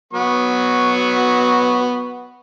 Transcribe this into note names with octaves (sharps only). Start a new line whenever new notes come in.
F#3 B3 C#6